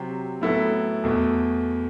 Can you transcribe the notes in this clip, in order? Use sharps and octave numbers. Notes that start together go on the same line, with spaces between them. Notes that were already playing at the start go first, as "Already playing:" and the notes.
Already playing: C3 F#3 C4
A2 F#3 B3 E4 A4
E2 B2 A3